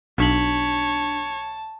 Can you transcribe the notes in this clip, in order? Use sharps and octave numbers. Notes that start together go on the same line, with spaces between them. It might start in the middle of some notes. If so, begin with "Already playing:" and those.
B1 D4 C#5 A5 B6 F#7